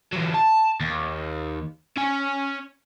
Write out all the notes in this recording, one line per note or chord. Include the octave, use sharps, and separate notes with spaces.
E3 F#3
A5
D#2
C#4 G#5